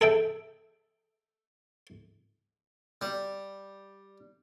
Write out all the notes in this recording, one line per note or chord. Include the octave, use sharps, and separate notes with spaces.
G#4 A4 E5 G5
G3